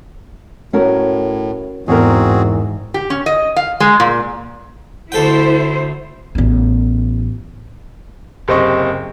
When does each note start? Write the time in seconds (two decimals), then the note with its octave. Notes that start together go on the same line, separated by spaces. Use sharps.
0.73 A2 C#4 F#4 A#4
1.88 E2 G#2 C4 F#4 G#4 A#4
2.94 G4
3.10 C#4
3.26 D#5
3.56 F5
3.80 G#3
4.00 A#2
5.12 D2 E4 A4 C5 G5
6.35 A1 B3
8.48 F#1 C3 C5 D#5 C#6